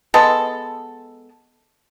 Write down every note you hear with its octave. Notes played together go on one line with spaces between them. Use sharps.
G#3 B3 A4